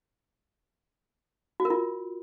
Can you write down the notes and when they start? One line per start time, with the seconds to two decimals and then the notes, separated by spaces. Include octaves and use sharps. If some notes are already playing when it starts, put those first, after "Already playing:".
1.60 F#4
1.65 A#4
1.70 F4